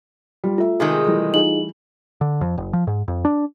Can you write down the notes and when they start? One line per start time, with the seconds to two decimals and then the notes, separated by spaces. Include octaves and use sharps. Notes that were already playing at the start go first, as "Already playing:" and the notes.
0.44 G3 F4
0.58 A3 F4 E5
0.80 C3 D#3 G#3 G#4
1.06 E3 G3 A3
1.34 D#4 F4 G#4 F#7
2.21 D3
2.41 F2
2.58 F#1
2.73 F3
2.87 G#2
3.08 F2
3.25 D4